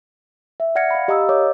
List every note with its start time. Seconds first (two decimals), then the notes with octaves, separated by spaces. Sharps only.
0.60 E5
0.75 D5 F#5 F6 G#6 A#6 C#7
0.91 F5 B5
1.08 G4 D#5 F5 A#5 D#6 E6
1.29 A#4 C#5 D#5 D6